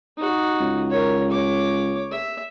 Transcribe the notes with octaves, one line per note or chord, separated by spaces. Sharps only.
D#4 F#4
C#2
A#4 C#5
C#5 D6
E5